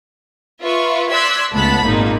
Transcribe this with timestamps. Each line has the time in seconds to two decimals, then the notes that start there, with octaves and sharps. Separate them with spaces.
0.61 F4 B4 E5 C#6
1.09 D5 C6 E6 F#6 G#6 B6
1.52 C#2 A3 B3 A5 B5 B6
1.85 G#1 A#2 A#3 D#4